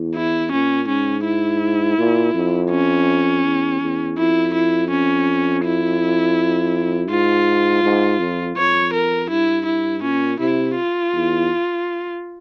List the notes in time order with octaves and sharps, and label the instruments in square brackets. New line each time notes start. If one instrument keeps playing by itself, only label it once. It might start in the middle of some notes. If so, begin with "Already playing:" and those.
Already playing: [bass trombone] E2
[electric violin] E4
[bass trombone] A#2 [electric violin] C#4
[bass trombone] G#2 [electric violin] C#4
[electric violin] E4
[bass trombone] A#2
F2
[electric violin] C#4
[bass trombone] E2
E2
[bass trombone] F2 [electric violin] E4
[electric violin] E4
C#4
E4
[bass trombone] G#2 [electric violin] F4
[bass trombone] G#2
F2
[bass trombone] F2 [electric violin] C#5
[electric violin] A#4
[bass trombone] G2 [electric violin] E4
[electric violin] E4
[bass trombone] A#2 [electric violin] C#4
[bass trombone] C3 [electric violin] E4
[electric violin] F4
[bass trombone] E2